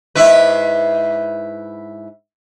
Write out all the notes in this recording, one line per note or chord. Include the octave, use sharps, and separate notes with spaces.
G#2 E4 B4